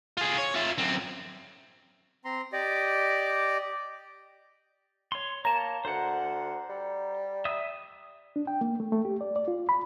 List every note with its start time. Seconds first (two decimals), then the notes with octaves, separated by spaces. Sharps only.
0.17 F4 G#4
0.38 C#5
0.55 F4 E5
0.78 F#2 C4
2.25 C4 A#5 C6
2.53 G4 D5 D#5
5.12 C#5 C6
5.45 A#3 C#5 A5 A#5
5.85 D2 C5 F#5
6.69 G3
7.45 E5 D#6 E6
8.36 D4
8.47 G5
8.61 A#3
8.80 A3
8.92 A3
9.05 G4
9.21 D5
9.36 D5
9.48 F4
9.69 B5